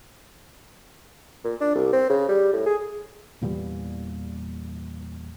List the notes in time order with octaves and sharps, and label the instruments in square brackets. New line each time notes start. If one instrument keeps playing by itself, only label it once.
[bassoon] A#2
D4
C2
C4
C#3
G3
A2
G#4
[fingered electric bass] E2 A#2 E3 G3